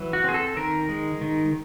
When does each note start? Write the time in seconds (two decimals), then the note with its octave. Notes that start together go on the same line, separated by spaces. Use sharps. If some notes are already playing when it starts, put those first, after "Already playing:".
Already playing: E3 F#3
0.13 F#4
0.24 C4 G#4
0.34 A4
0.57 D#3 A#4
0.89 G#3
1.21 D#3